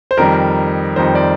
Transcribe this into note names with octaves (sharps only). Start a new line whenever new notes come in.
C5
F2 D#3 G3 A#4
F2 D#3 G3 C5
D5